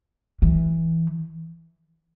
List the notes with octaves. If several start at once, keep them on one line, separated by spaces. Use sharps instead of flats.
E3